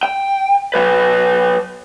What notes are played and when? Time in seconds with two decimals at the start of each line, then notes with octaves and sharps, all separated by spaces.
0.03 G5
0.74 F#3 B4